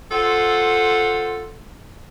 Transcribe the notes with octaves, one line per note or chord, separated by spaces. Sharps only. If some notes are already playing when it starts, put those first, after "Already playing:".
F4 A4 C5 F#5